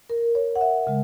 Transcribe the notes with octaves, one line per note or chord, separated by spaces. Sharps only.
A#4
C#5
F#5
E5
C#3 G#3